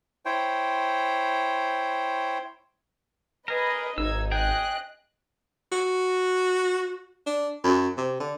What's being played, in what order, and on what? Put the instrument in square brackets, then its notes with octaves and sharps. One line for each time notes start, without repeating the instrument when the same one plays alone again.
[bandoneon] E4 C5 C#5 G5
[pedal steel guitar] G#4 A#4 [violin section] B4 D#5 B5
[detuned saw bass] G#1 [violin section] D#4 G#6 [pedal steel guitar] E6
[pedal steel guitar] G#4 G5 [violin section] D#5 F#6
[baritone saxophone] F#4
D4
F#2
C3
D3